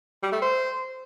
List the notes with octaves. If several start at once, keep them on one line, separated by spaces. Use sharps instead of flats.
G3
A3
C5